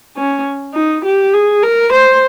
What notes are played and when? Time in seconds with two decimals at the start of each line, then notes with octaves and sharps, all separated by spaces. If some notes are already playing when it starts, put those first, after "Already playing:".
0.16 C#4
0.74 D#4
1.04 G4
1.33 G#4
1.63 A#4
1.92 C5